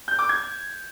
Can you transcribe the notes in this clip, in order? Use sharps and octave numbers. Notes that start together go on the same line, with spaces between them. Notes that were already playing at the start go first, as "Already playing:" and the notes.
G6
D6
G#6